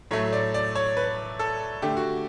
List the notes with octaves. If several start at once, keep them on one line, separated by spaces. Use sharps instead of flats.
A2 F#3 A3 C#5
D5
D5
C#5
B4
A4
D3 A3 G4
F#4